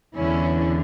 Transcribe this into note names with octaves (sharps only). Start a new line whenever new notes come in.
E2 D3 C#4 E4